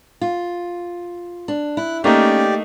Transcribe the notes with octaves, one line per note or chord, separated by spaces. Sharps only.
F4
D4
E4 F#6
A3 A#3 C#4 D#4 G4 D5